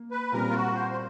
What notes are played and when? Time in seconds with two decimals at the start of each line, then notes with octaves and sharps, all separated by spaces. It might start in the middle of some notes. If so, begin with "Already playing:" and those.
Already playing: A#3
0.12 B4
0.32 A#2 G3 C4 A#4
0.50 F4
0.54 F#4
0.75 C5
0.92 C5